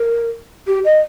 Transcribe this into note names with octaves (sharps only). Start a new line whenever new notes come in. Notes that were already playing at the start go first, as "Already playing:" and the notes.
Already playing: A#4
G4
D#5